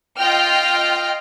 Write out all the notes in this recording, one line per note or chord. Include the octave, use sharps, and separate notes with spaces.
F4 D#5 G5 F6